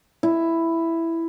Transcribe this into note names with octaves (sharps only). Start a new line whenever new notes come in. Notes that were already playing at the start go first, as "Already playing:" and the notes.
E4